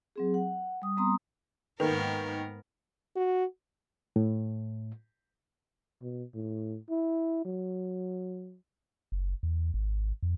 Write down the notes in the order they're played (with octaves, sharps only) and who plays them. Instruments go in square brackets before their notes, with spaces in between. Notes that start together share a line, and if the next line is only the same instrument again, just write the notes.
[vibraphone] F#3 C4 G#4
F#5
G3 D#6
G3 B3 C4 A#5 C6 D#6
[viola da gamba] G#2 B3 A#4 [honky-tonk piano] D#3 A#3 [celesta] B4
[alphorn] F#4
[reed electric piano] A2
[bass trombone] B2
A2
E4
F#3
[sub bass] F#1
E2
G#1
F2